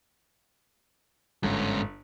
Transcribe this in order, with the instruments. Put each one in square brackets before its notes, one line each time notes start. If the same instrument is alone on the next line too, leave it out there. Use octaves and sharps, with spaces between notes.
[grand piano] G1 [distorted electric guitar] G#2 C#4